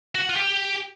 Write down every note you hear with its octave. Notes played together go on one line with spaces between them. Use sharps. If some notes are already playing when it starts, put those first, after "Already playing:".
F#4
F#5
F4
G4